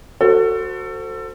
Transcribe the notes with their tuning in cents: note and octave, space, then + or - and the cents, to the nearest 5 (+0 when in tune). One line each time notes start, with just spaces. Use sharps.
F#4 +0 A4 +25 C5 +0